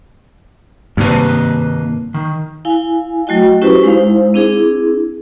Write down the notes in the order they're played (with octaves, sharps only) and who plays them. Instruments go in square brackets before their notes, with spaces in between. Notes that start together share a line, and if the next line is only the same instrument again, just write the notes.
[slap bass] G2 C3 [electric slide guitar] D#3 A#3 B4
[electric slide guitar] D#3
[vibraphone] E4 F5 G#5
F#3 A3 F#4 D#5 G5
C#4 E4 F#4 G4 B4 C5
G#3 D#4 E4 C5 F5
C4 D4 E4 G#4